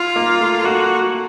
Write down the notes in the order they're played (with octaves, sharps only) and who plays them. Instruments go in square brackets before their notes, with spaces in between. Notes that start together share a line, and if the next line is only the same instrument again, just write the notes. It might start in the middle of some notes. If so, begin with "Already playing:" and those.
Already playing: [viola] F4
[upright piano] A#3
A3
[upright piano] A#3 [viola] F#4
[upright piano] A3